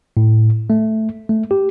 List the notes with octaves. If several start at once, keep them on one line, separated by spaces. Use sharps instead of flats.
A2
A3
A3
G4